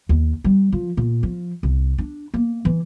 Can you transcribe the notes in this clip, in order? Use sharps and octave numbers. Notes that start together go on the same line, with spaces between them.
D#2
G3
F3
A#2
F3
C2
D4
A#3
E3